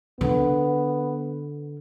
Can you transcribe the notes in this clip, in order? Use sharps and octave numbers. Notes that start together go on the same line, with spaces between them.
D3 B3